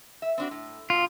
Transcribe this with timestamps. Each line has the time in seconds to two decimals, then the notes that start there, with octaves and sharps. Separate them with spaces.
0.22 E5
0.38 C4 D4 F#4
0.51 A2
0.90 G2 B2 F4